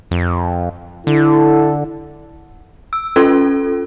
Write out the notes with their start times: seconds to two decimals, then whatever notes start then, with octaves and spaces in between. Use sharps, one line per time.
0.11 F2
1.07 D3 E4 A4
2.93 E6
3.16 C#4 F4 A4